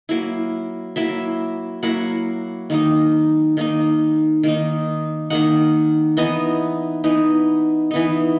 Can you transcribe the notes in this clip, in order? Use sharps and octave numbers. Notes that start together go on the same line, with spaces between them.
F#3 A#3 E4
F#3 A#3 E4 E5
F#3 A#3 E4 F#5
D#3 A#3 D#4
D#3 A#3 D#4
D#3 A#3 D#4
D#3 A#3 D#4 F#5
E3 B3 D#4 D#5
E3 B3 D#4
E3 B3 D#4